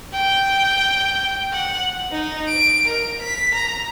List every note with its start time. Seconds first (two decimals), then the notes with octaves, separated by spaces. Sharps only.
0.14 G5
1.52 F#5
2.11 D#4
2.48 D7
2.87 A#4
3.22 B6
3.55 A#5